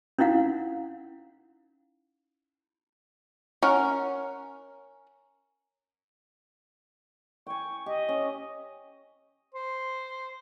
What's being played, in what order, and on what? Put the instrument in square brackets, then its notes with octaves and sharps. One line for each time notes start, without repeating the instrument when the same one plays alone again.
[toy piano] C#4 D#4 E4 F5 F#5
[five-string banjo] C#4 A#4 F#5
[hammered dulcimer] G5 G#5 [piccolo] C#6
[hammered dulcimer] G4 [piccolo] D#5
[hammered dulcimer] C#4
[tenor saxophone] C5